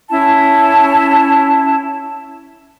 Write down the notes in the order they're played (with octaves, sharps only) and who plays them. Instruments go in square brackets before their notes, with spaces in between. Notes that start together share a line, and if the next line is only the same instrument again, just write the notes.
[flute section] C#4 E4 A5